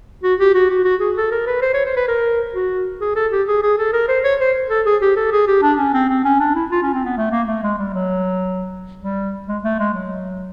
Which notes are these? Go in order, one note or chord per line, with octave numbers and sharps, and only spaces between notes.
F#4
G4
F#4
F#4
F#4
G#4
A4
A#4
B4
C5
C#5
C5
B4
A#4
F#4
G#4
A4
G4
G#4
G#4
A4
A#4
C5
C#5
C5
A4
G#4
G4
A4
G#4
G4
D4
C#4
C4
C4
C#4
D4
E4
F4
C#4
C4
B3
A3
A#3
A3
G#3
G3
F#3
G3
G#3
A3
G#3
F#3